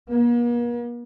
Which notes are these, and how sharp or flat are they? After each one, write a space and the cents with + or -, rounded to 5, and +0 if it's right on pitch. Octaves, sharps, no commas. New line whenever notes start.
A#3 +45